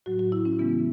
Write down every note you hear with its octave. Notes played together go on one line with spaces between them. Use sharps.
A2 F#3 F#4
F#4
E4
C#4
C#3 E3 G#3 B3